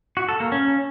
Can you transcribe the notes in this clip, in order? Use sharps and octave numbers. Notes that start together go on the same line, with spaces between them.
F#4
A4
A#3
C#4